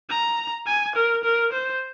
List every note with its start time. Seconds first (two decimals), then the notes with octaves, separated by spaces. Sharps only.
0.10 A#5
0.66 G#5
0.95 A#4
1.24 A#4
1.52 C5